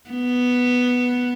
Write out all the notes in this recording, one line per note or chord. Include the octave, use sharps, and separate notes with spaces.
B3